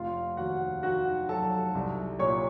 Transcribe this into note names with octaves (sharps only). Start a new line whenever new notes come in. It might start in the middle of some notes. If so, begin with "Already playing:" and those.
Already playing: F1 F4 F5
D#2 F#4 F#5
D#3 F#4 F#5
F#3 A4 A5
C2
A#2 C#5 C#6